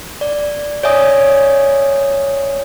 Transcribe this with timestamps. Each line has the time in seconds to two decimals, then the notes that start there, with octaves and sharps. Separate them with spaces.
0.21 D5
0.83 C#5 D5 E5 G#5 D#6